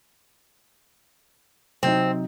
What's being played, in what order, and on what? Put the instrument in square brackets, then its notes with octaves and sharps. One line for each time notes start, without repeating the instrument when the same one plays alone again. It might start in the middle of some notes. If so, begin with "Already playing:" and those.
[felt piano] C3 F#3 D#4 [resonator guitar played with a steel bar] C4